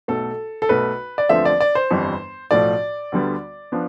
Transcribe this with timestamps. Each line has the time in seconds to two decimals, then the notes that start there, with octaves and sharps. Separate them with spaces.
0.08 B1 B2 A3 A4
0.62 A4
0.69 B1 B2 A3 B4
1.18 D5
1.29 E2 D3 F3 A3 C4 E5
1.45 D5
1.60 D5
1.75 C5
1.91 G1 F2 E3 G3
2.51 B1 A2 F3 A3 D5
3.12 D2 D3 G3 B3
3.72 F3 B3 D4